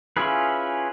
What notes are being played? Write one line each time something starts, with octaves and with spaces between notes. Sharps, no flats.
C#4 E4 F4 G#4 B4